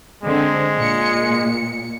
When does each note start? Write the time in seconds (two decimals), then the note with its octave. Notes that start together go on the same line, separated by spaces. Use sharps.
0.24 D3 G#3 C4
0.77 A#2 C#7